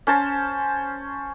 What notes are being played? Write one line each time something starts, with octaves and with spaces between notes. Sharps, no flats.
C#4 C5 A5